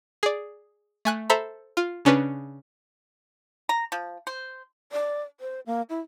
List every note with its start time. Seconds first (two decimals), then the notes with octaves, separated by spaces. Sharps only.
0.23 G#4 D5
1.05 A3 G#5 F#6
1.30 A4 C5 E5 A#5 B5
1.77 F4
2.05 C#3 C#4 D4 B4
3.69 A#5
3.92 F3
4.27 C5
4.92 D5
5.40 C5
5.66 A#3
5.89 E4